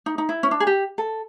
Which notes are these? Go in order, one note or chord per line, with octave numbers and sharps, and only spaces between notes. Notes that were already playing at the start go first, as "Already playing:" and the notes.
D#4
D#4
E4
C#4
D4
G#4
G4
A4